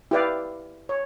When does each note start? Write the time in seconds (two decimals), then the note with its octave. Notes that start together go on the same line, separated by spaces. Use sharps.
0.11 E4 G4 B4 D5 F5
0.89 C#5